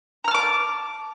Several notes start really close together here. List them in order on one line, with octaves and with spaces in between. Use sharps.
A#5 F6 A5 D6